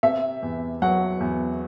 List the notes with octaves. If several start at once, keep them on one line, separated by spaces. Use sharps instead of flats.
C3 E5
E2
F#3 F#5
E2